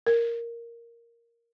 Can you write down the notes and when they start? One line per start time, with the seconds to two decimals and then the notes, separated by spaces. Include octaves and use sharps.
0.07 A#4